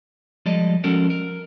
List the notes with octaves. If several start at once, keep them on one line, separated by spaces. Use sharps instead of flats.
F3 G3 G#3 A4 D5 D#5
F3 G#3 C#4 F#4 A4 A#4
A#4